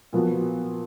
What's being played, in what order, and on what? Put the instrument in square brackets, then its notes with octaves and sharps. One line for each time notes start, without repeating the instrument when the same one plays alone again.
[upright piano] A#2 F3 B3 F#4